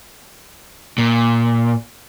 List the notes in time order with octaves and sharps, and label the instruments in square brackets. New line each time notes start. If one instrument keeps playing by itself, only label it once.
[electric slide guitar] A#2